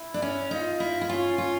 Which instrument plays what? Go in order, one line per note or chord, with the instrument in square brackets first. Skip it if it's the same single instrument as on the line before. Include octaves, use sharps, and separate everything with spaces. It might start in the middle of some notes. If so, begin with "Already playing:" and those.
Already playing: [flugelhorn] E4
[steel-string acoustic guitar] D4
C#4
[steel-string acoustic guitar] D#4 [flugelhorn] F4
[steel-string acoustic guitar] E4
E4
[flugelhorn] C#4 [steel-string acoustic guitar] F4
[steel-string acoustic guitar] F4